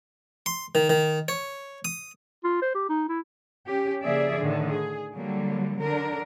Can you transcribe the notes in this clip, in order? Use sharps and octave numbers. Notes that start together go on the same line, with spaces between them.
C6
D#3
D#3
C#5
D#6
F4
C5
G4
D#4
E4
C#4 G4
C#3 F3 A#3 G#4 D5 E5
A2 D3 D#3
G#4
D3 F#3 G3 A#3
D3 D4 A#4